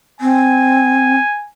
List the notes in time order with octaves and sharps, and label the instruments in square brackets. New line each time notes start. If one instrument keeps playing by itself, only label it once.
[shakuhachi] C4 [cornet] G#5